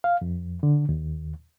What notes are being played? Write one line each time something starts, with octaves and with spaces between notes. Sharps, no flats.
F5
F2
D3
D#2